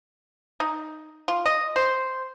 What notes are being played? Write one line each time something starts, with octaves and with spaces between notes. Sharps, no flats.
D#4
F4
D#5
C5